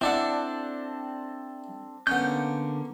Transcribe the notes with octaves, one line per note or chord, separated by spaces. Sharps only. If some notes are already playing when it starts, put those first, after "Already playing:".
C4 D4 E4 A4 D5 F#5
D3 A#3 B3 C#4 G6